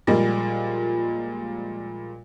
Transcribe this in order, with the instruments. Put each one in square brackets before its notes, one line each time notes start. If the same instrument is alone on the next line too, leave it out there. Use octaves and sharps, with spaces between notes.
[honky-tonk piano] A#2 F3 G3 G#3 A#3